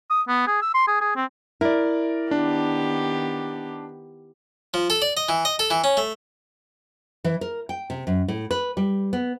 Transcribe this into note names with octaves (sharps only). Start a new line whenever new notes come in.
D#6
B3
G#4
E6
C6
G#4
G#4
C4
E4 A#4 D5
D#3 B3 D4 G4
F3
A4
D5
D#5
E3
D#5
A4
E3
C#4
A3
E3
A#4
G5
C3
F#2
A2
B4
G3
B3